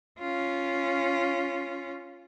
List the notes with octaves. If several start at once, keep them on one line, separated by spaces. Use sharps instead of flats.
C#4 F4